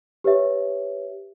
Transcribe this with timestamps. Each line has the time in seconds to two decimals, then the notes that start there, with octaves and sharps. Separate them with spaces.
0.24 G4 B4 C#5 E5